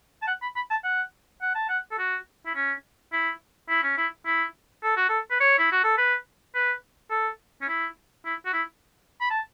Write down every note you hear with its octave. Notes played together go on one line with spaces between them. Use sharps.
A5
F#5
B5
B5
A5
F#5
F#5
A5
F#5
A4
F#4
E4
C#4
E4
E4
C#4
E4
E4
A4
F#4
A4
B4
C#5
E4
F#4
A4
B4
B4
A4
C#4
E4
E4
F#4
E4
B5
A5